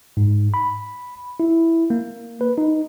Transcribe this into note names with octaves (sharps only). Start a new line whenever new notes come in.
G#2
B5
E4
A#3
B4
D#4